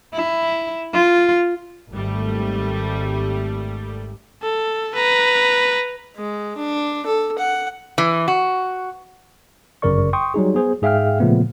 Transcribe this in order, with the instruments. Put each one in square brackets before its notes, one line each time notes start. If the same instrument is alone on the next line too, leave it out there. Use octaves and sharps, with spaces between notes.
[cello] E4
F4
[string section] G#1 G3 A3
[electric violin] A4
B4 A#5
[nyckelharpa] G#3
D4
A4
F#5
[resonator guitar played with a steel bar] E3
F#4
[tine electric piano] G1 F#2 C#3 A#4 D5 C#6
G5 C6 C#6 D#6
F#3 G3 D#4 G#4
B3 G#4 C5
G#2 G#4 E5 F5 G5 F6
A#2 C#3 F3 A3 B3